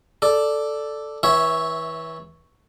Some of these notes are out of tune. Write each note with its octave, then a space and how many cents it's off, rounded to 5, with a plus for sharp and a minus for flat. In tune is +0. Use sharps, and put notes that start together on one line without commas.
A4 +0 D5 +0
E3 -25 C#5 +0 E5 +0